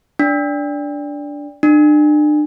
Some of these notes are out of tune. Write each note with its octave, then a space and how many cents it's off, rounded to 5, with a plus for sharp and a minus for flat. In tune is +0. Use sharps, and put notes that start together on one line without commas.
D4 -10
D4 +35